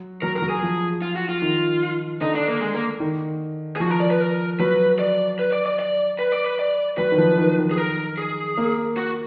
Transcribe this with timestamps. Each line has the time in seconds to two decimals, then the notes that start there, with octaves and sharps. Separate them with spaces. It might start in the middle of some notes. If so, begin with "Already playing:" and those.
Already playing: F#3
0.22 F#3 A#4
0.36 A#4
0.42 F#3
0.49 G#4
0.63 F3
1.02 F4
1.15 F#4
1.29 F4
1.42 D#3
2.21 D3 D#4
2.35 D4
2.48 A#3
2.61 G#3
2.74 A#3
3.00 D#3
3.76 G#4
3.80 F3 F#4
3.90 A#4
4.00 D5
4.10 B4
4.20 A#4
4.59 F#3 B4
4.99 D5
5.39 B4
5.53 D5
5.66 D5
5.79 D5
6.19 B4
6.32 D5
6.44 B4
6.59 D5
6.98 F#3 B4
7.12 D#3
7.18 F3
7.38 D#3
7.58 D#3
7.71 G#4
7.77 A#4
8.18 G#4
8.57 A#3
8.97 F#4